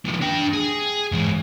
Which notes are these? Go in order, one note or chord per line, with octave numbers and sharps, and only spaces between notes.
D#3 F3
D4 G5
G#4
G#2 E3